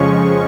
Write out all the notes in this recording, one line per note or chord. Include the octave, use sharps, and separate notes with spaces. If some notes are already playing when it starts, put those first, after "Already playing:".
Already playing: F2 C#3 F3 G#3 C#4 C#6